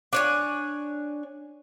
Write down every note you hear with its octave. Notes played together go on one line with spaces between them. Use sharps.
D4 C#5 G#5